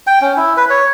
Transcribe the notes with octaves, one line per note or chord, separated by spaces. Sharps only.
G5
C#4
E4
B4
C#5